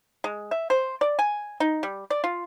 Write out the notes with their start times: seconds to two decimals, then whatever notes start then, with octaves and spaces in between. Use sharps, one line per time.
0.24 G#3
0.51 E5
0.70 C5
1.01 D5
1.19 G#5
1.60 D#4
1.83 G3
2.10 D5
2.24 F4